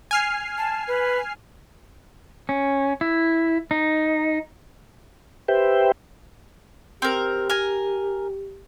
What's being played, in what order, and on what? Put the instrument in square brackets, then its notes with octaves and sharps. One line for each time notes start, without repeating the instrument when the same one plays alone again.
[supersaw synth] G#5 F6 C7
[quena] A5
B4
[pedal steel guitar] C#4
E4
D#4
[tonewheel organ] G4 B4 C5 E5 G5
[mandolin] C4 A#4 [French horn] G4
[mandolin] A#4 G#5